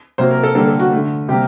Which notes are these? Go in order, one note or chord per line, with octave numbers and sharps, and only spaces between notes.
C3 F#3 A#3 C5
A#4
A4
D3 G3 A#3 A4
A4
F#4
D3 A3
C3 G3 A#3 G4